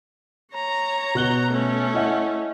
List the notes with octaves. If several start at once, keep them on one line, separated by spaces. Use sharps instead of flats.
C#5 A#5
B2 F#6 G7
A3 C#4
E4 D#5 F#5